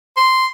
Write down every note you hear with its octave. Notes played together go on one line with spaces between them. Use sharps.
C6